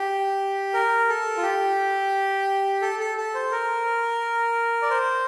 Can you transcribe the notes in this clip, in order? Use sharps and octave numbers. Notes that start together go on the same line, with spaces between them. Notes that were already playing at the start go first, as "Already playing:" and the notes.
Already playing: G4
A#4
A4
F4
G4
A4
A4
A4
C5
A#4
D5
C5